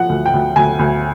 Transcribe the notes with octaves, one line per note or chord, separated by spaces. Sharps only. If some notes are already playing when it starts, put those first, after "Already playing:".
Already playing: F3 F#5
D2
G5
D2
D2 G#5
D2